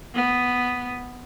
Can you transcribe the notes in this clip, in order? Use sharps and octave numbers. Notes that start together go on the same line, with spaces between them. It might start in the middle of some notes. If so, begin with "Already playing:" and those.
B3